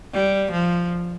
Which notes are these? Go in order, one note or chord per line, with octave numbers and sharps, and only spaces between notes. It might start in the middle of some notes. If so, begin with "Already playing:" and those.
G3
F3